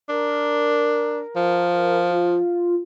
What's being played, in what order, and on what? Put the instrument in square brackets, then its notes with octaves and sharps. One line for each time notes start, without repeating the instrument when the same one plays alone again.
[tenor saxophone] D4 [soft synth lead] A#4
[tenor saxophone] F3
[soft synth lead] F4